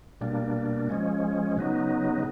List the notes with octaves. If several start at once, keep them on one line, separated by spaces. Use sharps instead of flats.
B2 G3 A#3 D4
F3 G#3 C#4
C#3 F#3 B3 D#4